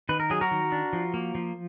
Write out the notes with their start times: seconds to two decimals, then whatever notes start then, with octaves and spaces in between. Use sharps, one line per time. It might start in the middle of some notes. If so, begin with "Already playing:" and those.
0.09 D#3 B4
0.20 A#4
0.30 F#3 G#4
0.41 F#4 A#4
0.51 D#3
0.72 D4
0.93 F3
1.14 A#3
1.35 F3